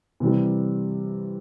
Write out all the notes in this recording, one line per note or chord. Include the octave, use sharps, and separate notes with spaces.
C3 E3 G3